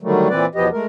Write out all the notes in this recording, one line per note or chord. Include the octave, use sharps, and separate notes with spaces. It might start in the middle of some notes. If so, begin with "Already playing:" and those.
D3 D#3 F#3 G3 A3
A#2 E3 C4 B4 D5
E2 B2 F3 B3 G4 D#5
G#3 A3 A#4